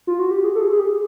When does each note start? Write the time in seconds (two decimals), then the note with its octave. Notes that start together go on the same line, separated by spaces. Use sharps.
0.07 F4
0.19 F#4
0.31 G4
0.44 G#4
0.55 A4
0.61 G#4
0.72 G#4
0.79 G4